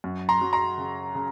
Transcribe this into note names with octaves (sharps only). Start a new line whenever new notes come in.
F#2
A#5 C6
F#3
A#5 C6
C#3
C#3